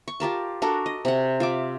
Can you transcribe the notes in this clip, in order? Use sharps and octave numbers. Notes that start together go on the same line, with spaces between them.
C#6
F4 G4 A#4 A5
D4 F#4 A4 A#4
D#5
C3 F#5
F4 E5 D6